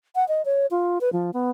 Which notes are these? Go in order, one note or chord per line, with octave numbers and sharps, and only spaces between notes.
F#5
D#5
C#5
F4
B4
F3
B3